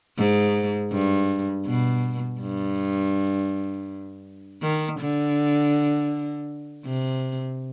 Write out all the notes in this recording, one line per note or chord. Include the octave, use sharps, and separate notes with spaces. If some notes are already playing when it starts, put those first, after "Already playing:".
G#2
G2
B2
G2
D#3
D3
C3